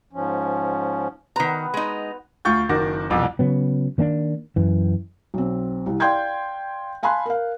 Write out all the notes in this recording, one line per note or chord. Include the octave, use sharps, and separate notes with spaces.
G#2 F3 C#4
D#3 B3 F#4 B4 A#5
G#3 D#4
D2 F4 C#6 G6 A6
F#1 D#3 F#4 D6 A#6
E1 C2 F2 D6
C#3 F#3 B3
D#3 A#3 C#4 D4
F#2 E3
B1 C4
C2
D5 F5 G5 C6 G6 G#6
F5 G#5 A5 B5 C6 F#6
A#4 F5